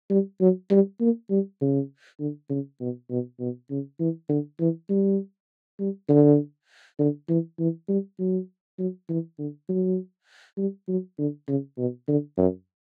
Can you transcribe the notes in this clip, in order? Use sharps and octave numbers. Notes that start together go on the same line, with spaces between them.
G3
F#3
G3
A#3
G3
C#3
D3
C#3
B2
B2
B2
C#3
E3
D3
E3
G3
G3
D3
D3
E3
E3
G3
F#3
F#3
E3
D3
F#3
G3
F#3
D3
C#3
B2
D3
F#2